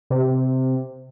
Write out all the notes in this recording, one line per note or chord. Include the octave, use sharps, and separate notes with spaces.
C3